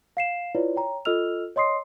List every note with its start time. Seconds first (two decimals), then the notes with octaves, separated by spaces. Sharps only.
0.17 F5 C7 E7
0.55 E4 F4 B4 C#5 D5
0.76 C#5 G5 A#5
1.05 F4 A4 D#5 E6 F6 F7
1.56 C#5 D#5 C6 D#6 C7